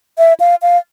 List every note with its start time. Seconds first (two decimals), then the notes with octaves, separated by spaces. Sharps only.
0.18 E5
0.40 F5
0.62 F5